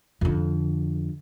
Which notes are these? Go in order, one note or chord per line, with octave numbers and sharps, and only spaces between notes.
F2 D3